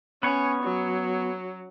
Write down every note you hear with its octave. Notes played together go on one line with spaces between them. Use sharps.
B3 C#4 C#5
F#3